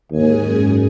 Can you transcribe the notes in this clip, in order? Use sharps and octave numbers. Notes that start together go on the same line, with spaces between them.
D#2 G#2 G#4 G#5
F#2